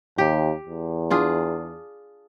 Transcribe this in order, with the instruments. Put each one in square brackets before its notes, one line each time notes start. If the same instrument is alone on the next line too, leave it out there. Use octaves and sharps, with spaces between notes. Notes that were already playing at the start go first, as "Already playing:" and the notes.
[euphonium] D#2 [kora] G4
[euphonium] E2
[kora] D4 F4 G#4